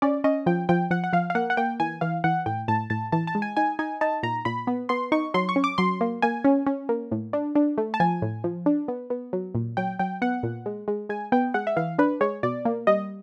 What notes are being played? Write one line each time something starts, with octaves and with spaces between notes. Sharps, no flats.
C#4 D5
C#4 D#5
F3 G5
F3 G5
F3 F#5
F#5
F3 F5
F5
A#3 F#5
F#5
A#3 G5
E3 G#5
E3 F5
E3 F#5
A2 G5
A2 A5
A2 A5
E3 A5
A5
G#3
G#5
D#4 G#5
D#4 G#5
D#4 A5
A#2 A#5
A#2 B5
B3
B3 C6
D#4 C#6
F#3 C6
C#6
C#4
D6
F#3 C6
A#3
A#3 G#5
C#4
C#4
A#3
A2
D4
D4
A3
A5
F3 G#5
A2
F3
D4
B3
B3
F#3
A#2
F#3 G5
F#3 G5
B3 F#5
A#2
G#3
G#3
G#3 G#5
B3 G5
G#3 F#5
E5
E3 F5
D4 B4
G#3 C#5
B2 D5
A#3
G3 D#5